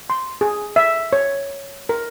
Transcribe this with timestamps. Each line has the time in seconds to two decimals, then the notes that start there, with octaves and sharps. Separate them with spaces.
0.10 C6
0.41 G#4
0.76 E5
1.13 C#5
1.89 A#4